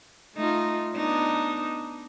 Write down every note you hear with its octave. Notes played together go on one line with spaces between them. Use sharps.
A3 D#4 F4
B3 D4 D#4